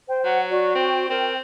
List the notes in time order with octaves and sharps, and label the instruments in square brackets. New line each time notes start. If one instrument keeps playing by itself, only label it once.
[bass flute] C5 [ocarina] G5
[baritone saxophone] F#3 [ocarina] F#5
[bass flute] F#4 [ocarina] D5
[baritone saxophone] C4 [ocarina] G5
[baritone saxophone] C4 [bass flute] A#4